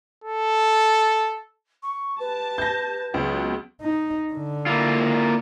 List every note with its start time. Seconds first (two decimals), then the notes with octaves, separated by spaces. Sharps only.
0.24 A4
1.83 C#6
2.20 G4 B4 A5
2.58 G6 A#6
3.14 C#2 F#3 G#3 B3
3.81 D#4
4.33 D3
4.66 A#3 E4 F4